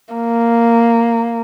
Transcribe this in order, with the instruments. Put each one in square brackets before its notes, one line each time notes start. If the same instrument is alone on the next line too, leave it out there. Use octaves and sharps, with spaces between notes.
[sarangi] A#3